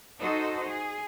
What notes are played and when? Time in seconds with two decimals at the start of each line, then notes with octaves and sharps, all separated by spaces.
0.19 D#4 F#4 A4 C5 D#5
0.67 G#4